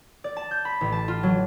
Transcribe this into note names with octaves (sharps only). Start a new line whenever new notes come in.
D5
A5
G6
B5
A1
A5
F4
F#3